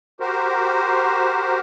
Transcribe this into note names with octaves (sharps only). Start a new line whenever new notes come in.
F#4 G4 A#4 C5